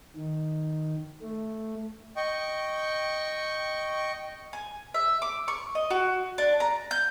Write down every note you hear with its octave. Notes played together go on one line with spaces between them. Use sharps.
D#3
A3
D#5 G5 C#6
G#5
E5
D6
C#6
D#5
F#4
D4
A#5
G6